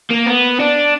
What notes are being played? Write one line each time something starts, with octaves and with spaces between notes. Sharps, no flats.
A#3
B3
D4